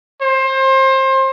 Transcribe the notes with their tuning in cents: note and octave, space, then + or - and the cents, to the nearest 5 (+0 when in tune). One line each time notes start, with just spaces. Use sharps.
C5 +25